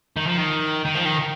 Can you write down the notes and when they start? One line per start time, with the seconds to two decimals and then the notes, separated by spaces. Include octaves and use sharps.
0.17 D#3
0.27 F3
0.38 D#3
0.85 D#3
0.95 F3
1.05 D#3